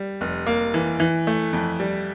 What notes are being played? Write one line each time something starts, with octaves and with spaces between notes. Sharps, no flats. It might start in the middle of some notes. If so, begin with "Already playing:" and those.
Already playing: G3
F1
A#3
E3
E3
A3
F2
G3